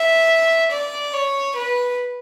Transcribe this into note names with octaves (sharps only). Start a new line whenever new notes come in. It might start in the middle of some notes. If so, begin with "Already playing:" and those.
Already playing: E5
D5
C#5
B4